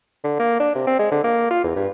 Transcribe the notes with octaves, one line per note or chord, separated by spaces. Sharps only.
D3
A#3
D4
C3
C4
G#3
D3
A#3
F4
E2
G2